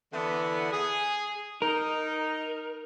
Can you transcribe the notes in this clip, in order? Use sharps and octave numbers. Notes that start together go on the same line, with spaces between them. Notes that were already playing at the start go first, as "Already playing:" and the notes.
D3 E3 B3
G#4
D#4 A#4